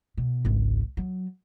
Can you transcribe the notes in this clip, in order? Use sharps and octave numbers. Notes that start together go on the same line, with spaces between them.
B2
G#1 C#2
F#3